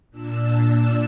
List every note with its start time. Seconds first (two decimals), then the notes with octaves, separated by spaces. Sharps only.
0.10 A#2 D4 E6